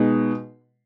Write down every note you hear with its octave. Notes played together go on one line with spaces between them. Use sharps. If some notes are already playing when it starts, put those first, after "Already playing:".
Already playing: B2 G#3 D#4